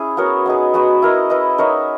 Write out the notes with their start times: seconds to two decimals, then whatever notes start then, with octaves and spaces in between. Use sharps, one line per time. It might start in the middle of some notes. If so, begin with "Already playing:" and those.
Already playing: C#4 E4 G#4
0.17 B3 F#4 A#4 C#5
0.46 B3 D#4 G#4
0.74 G#3 B3 F#4 B4
1.02 E4 A#4 D#5
1.30 E4 B4 D#5
1.58 D#4 A#4 C#5 E5